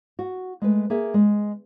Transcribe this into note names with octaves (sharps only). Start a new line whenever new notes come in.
F#4
G#3 A3 B4
A#3 G#4 E5
G#3